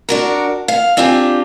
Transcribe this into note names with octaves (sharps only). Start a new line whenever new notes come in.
D4 F#4 A#4
F5
C4 D4 F4 G4 G#5